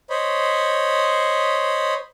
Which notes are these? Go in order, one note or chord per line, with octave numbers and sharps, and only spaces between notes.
C5 C#5 D#5 B5